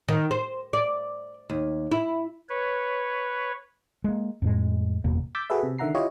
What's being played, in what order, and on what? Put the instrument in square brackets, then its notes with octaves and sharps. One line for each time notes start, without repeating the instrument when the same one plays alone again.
[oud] D#3
C5
D5
D#2
E4
[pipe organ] B4 C#5
[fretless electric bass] G#3 A#3
F2 A2 G#3
F#1 E2 B2 A#3
[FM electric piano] D6 E6 G6 A6 B6
F#4 G#4 A4 B4 E5
C3
D3 D#3 E5 F#5 A#5 C7
E4 F4 G4 C#5 D#5